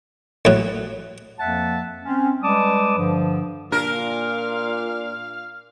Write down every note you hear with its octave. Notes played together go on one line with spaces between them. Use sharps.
A2 F#3
F2 F3 A#3 E5 F#5 A5
C4 C#4
G3 G#3 B4 A5 D6 D#6
G2 D3 F3
A#2 D4 A#4 F5